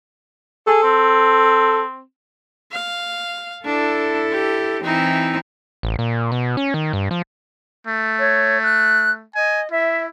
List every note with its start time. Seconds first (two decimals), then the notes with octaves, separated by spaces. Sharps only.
0.67 G#4 A4
0.83 C4
2.72 F5
3.65 D4 E4 A4
4.31 G4
4.84 E3 C4 D#4 E4
5.83 A1
5.99 A#2
6.32 B2
6.57 C#4
6.74 D#3
6.93 G2
7.11 F3
7.87 A3
8.19 C#5
8.63 F#6
9.35 D#5 G#5
9.71 E4 E5